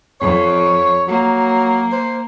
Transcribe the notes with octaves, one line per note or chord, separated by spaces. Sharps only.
F2 C#5
F#3 A#3
C5